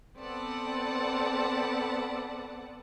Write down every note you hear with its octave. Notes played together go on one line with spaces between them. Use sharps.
B3 C4 A4 D5 F#5 A5